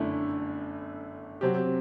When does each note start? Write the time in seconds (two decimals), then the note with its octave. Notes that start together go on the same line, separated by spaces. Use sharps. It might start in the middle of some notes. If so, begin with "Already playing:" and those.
Already playing: G1 F#2 D3 A3 E4
1.41 C3 F#3 C4 G4